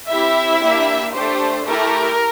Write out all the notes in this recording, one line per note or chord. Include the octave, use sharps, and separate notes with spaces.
C4 E4 G4 E5
A#3 D4 G4
A3 D4 G4 C5
A3 E4 G4 A#4